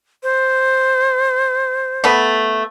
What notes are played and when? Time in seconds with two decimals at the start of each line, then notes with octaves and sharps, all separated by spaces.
0.23 C5
2.04 A3 B3